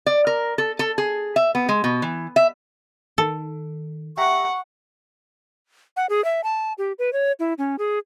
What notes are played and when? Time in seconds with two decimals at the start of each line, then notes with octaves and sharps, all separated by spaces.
0.06 D5
0.27 A#4
0.58 A4
0.79 A4
0.98 G#4
1.36 E5
1.55 B3
1.69 G#3
1.84 B2
2.02 E3
2.36 E5
3.18 D#3 A4
4.18 G4 E5 F#5 A#5 C#6
5.97 F#5
6.09 G#4
6.24 E5
6.44 A5
6.78 G4
6.99 B4
7.13 C#5
7.40 E4
7.58 C#4
7.79 G#4